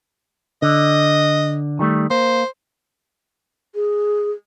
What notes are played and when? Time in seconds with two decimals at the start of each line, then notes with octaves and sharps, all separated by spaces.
0.62 D3 D#5
1.79 D#3 G3 A3
2.10 A#3 C5
3.75 G#4